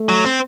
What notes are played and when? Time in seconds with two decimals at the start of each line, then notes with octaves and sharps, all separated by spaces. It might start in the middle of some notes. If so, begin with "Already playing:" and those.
Already playing: A3
0.09 F#3
0.25 C4